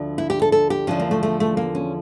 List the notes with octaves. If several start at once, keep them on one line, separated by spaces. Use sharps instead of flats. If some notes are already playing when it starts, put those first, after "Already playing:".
Already playing: D2 D3 F3
E4
G4
A4
A4
G4
E2 D3 F3 C#4
A#3
A3
A3
A3
A#3
C#4